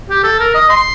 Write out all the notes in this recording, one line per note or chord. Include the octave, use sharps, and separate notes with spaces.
G4
A4
A#4
D#5
C6